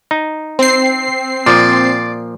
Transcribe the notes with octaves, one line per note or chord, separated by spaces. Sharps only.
D#4
C4 C7
A#2 F3 D5